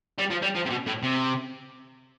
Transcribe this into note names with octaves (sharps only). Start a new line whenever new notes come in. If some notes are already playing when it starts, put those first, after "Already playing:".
G3
F3
G3
F3
C3
B2
A2
C3